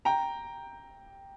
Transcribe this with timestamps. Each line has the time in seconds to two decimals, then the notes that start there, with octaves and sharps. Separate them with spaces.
0.05 G5 A#5